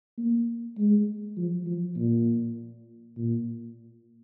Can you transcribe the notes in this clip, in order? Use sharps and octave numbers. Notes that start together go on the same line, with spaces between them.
A#3
G#3
F3
F3
A#2
A#2